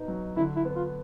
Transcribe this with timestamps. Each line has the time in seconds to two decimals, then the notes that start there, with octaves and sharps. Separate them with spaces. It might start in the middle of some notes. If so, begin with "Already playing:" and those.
Already playing: B2 B3 D#4
0.08 F#3
0.37 D3 E4
0.56 E4
0.65 B3
0.76 F4